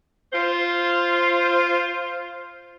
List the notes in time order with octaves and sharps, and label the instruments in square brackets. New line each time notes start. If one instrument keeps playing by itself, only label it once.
[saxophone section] F4 C5